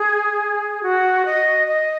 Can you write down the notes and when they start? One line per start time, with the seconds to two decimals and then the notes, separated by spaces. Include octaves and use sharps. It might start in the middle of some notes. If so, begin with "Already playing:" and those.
Already playing: G#4
0.83 F#4
1.26 D#5
1.68 D#5